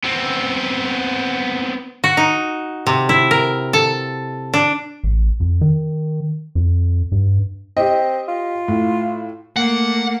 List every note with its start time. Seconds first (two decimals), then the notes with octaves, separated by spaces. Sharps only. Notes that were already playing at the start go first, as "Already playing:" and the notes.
0.04 B3 C4
2.04 F#4
2.17 D#4
2.87 C3
3.09 E4
3.31 A#4
3.73 A4
4.54 D4
5.04 A1
5.40 F2
5.61 D#3
6.55 F2
7.12 G2
7.77 C4 G4 D#5
8.28 F4
8.68 A2
9.56 A3 A#3 F#5